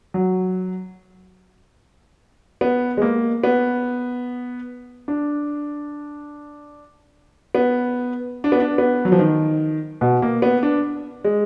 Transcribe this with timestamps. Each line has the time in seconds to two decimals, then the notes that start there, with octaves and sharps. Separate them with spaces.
0.14 F#3
2.61 B3
2.97 G#3
3.02 A#3
3.44 B3
5.08 D4
7.55 B3
8.44 D4
8.52 B3
8.60 D4
8.78 B3
9.05 F#3
9.12 F3
9.19 D#3
10.01 B2
10.22 A#3
10.42 B3
10.63 D4
11.24 G#3